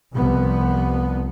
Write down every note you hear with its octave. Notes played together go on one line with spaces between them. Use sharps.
C2 F3 B3